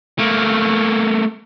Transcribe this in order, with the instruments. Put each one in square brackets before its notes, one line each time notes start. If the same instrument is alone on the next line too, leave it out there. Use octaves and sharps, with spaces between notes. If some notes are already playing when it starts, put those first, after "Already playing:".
[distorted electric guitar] A3 A#3